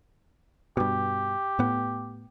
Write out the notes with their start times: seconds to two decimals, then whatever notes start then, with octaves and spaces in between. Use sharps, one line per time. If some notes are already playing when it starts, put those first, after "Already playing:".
0.77 G2 B2 G4
1.59 A2 B3